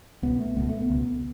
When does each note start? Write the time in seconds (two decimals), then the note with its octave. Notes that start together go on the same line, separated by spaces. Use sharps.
0.22 C#2 B2 B3
0.39 A3
0.56 C#2 B2 B3
0.69 A3
0.82 B3
0.90 C#2 B2